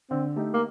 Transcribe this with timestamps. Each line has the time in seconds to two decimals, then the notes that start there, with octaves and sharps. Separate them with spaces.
0.10 D3 C4
0.36 A3 D#4 G4
0.53 A#3